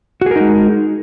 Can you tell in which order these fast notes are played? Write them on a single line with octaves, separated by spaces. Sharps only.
F#4 G#4 A#4 D#4 G#3